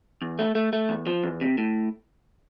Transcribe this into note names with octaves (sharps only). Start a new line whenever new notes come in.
E2
A3
A3
A3
E2
F3
E2
C3
A2